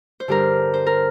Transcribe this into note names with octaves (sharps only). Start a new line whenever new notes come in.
C5
G2 D3 G4 A#4
C5
A#4